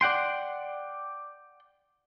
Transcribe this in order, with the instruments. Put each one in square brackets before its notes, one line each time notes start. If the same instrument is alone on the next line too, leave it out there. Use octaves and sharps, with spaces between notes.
[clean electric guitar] D5 F#5 G5 C6